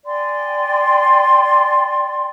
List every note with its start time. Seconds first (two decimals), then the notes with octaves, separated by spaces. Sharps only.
0.05 D5 G5 G#5 C6